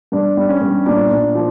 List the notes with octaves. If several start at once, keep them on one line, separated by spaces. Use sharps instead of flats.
G2 D4
G3
C#4
G2
A#2 D4
A#2
F3